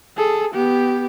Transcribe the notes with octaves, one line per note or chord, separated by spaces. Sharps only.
G#4 A4
B3 G4